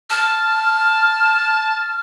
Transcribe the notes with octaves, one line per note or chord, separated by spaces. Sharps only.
A5 F6